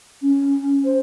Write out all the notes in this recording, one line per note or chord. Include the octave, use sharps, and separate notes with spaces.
C#4
C5